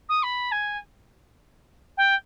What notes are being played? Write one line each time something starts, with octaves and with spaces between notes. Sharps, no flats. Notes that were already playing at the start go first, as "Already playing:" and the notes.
D#6
B5
G#5
G5